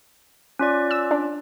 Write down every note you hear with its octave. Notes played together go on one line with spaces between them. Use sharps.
C#4 F4 D5
E6
D4